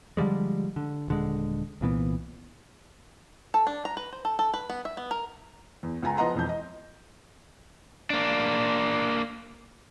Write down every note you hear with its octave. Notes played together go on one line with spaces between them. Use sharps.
D3 F3 G3 G#3
D3
D#1 D3 G#3
C2 A#2 E3 B3
A4
D4
A#5
B4
C5
A4
A4
B4
B3
E5
B3
A#4
E2
C#2 F4 G#5 A#5
F3 B3 D#5 F#5 A#5 C6
E1 F2 G6
D#5
A#3 D4